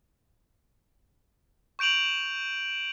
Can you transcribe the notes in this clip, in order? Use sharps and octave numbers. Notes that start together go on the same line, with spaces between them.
C#6 G6 D7 F7 F#7